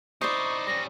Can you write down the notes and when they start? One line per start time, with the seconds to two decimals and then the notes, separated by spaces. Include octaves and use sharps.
0.21 D#4 E4 C5 D5 C#6 D#6 C7
0.67 G3 C#4 A#6